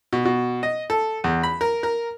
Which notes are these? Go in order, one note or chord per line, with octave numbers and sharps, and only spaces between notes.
B2
B2
D#5
A4
E2
B5
A#4
A#4